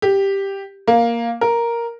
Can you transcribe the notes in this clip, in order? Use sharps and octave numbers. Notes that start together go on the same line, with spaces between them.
G4
A#3
A#4